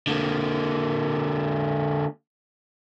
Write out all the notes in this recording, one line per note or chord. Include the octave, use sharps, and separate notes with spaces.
D3 A#3